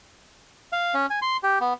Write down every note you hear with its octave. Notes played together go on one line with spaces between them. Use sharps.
F5
C#4
G#5
C6
G4
B3